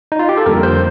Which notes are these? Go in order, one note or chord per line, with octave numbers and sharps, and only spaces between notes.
D#4
F4
G4
A4
F2 D3 G3 A#3 A#4
C5